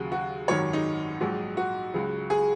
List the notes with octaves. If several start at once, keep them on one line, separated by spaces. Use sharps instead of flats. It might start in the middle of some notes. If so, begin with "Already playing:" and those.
Already playing: D#2 C#3 F#3
F#4
G#1 F#2 D#3 F#3 C#5
D#4
A#1 G#2 F#3
F#4
C#2 C#3 F#3
G#4